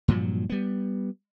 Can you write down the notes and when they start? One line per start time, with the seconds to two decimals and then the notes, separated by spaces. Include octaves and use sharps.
0.08 G2 A#2 F3 F#3
0.50 G3 B3